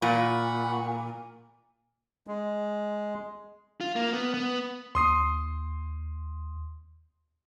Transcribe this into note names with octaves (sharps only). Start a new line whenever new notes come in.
A#2 F#5 B5 C#6
G#3
F4
A#3
B3
B3
D#2 C6 D#6 C7